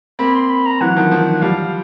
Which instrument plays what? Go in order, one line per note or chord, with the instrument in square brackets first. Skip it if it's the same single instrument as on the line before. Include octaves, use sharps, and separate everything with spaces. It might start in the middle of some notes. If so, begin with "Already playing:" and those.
[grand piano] A#3 C4 [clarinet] B5
[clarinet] C6
B5
A#5
[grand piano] E3 F#3 [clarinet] F#5
[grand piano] D#3 F3
D#3 F3
[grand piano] F3 G3 [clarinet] F5